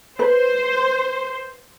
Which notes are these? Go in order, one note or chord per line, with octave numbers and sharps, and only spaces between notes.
B4 C5